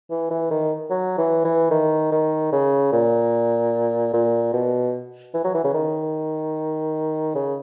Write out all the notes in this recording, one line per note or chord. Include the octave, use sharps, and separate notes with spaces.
E3
E3
D#3
F#3
E3
E3
D#3
D#3
C#3
A#2
A#2
B2
E3
F#3
E3
C#3
D#3
C#3